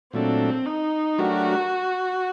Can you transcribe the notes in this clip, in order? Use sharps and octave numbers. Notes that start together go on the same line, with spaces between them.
A#2 F#3 A3 C4 D4 A4
D#4
F#3 A3 D4 F#4 G4 A#4